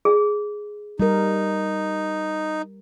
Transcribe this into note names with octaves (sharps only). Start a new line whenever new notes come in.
G#4
G3 D#4 A#4